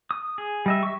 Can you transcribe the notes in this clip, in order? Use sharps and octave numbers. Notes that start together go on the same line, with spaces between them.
D#6
G#4
G3 D#5 E5
E5 C#6